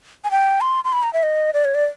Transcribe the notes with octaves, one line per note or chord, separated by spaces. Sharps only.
G#5
G5
C6
C6
B5
A#5
E5
D#5
D5
C#5
D5